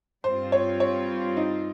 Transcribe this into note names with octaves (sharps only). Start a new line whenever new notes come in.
G2 G3 C4 F4 C5
C#5
C#5
D#4